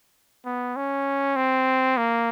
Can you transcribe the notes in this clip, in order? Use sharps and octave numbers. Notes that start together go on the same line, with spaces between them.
B3
C#4
C4
A#3